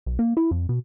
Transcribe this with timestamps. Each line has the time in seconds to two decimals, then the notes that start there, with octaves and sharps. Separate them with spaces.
0.06 B1
0.19 A#3
0.37 E4
0.51 F2
0.69 B2